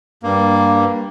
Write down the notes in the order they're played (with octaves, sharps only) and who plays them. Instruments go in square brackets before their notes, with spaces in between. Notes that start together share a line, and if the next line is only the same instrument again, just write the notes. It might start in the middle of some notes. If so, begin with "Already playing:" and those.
[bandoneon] G2 A#3